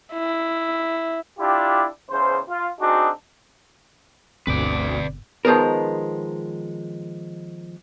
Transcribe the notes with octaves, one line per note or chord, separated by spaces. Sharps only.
E4
D4 E4 F4 G4
E2 C#3 C5
F4
C4 D4 D#4 F#4 G#4
G1 D2 B2 D3 C4 B4 D5
D#3 F3 G#3 B3 A#4